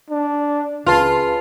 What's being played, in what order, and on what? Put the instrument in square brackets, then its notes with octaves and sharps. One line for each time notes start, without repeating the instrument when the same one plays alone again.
[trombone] D4
[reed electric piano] C#2 B4 A5 [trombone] C#3 [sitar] F4